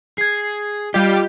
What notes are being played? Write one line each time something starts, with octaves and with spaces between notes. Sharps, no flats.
G#4 G#6 C7
G3 F4 G4 D#5